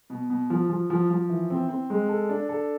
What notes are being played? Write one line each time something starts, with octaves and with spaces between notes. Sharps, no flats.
B2
B2
F3
F3
F3
F3
E3
C4
C4
G#3
A4
D4
A4